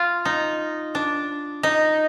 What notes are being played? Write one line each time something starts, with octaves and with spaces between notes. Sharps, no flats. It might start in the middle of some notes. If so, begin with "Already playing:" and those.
Already playing: F4
D#4
D4
D#4